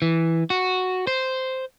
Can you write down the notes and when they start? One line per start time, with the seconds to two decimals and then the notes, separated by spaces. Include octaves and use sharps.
0.02 E3
0.50 F#4
1.07 C5